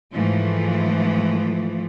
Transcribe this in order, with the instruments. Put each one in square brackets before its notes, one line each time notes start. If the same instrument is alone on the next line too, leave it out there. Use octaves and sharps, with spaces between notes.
[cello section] G#2 E3 F3 A3